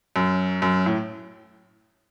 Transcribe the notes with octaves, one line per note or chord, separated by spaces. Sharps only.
F#2
F#2
A2